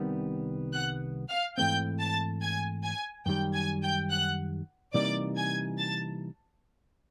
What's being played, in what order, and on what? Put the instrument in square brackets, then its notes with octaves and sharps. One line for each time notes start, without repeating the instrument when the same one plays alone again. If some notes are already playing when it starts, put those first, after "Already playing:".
Already playing: [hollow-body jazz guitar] C2 C3 D#3 G3 B3
[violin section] F#5 F#6
F5 F6
[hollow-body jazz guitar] G#2 E3 A3 C4 [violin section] G5 G6
[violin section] A5 A6
G#5 G#6
G#5 G#6
[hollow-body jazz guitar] F#2 D#3 G3 [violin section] G5 G6
[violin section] G#5 G#6
G5 G6
F#5 F#6
[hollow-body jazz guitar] C3 E3 G3 A#3 D#4 [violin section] D5 D6
[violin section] G#5 G#6
A5 A6